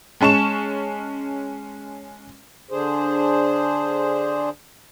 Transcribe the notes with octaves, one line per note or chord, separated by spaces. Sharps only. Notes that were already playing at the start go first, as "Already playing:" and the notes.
G#3 C#4 A5 C#6 E7
D3 D4 G#4 C5